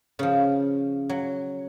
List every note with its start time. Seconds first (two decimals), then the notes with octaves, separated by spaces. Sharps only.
0.19 C#3 F3
1.09 F#3